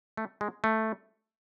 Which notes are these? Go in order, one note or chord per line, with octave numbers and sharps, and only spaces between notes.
A3
G#3
A3